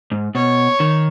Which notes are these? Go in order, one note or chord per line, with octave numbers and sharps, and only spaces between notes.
G#2
B2 C#5
D#3